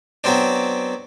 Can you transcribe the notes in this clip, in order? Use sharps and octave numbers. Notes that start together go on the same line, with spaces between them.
F#3 B3 C4 D4